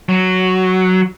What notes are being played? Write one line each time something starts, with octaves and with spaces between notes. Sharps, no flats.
F#3